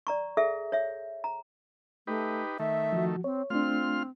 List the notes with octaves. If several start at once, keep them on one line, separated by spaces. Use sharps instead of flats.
D5 A#5 C#6
G#4 A4 E5
C#5 E5
A#5
A3 D#4 G4 B4
D#3 A3 E5
F3 F#4
C4 C#5
A3 C4 D4 F4 C6 F6